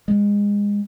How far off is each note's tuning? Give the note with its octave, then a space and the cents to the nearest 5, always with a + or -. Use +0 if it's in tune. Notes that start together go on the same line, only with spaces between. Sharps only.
G#3 -25